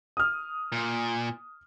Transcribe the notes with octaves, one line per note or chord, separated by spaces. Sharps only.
D#6 F6
A#2